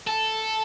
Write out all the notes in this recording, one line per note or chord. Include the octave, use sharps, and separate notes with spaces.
A4